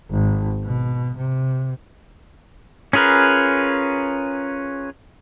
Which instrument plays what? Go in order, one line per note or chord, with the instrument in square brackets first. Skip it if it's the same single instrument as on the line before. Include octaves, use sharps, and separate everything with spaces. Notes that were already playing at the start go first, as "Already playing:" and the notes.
[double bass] G#1
B2
C3
[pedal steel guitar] C#4 F4 G#4 A#4 B4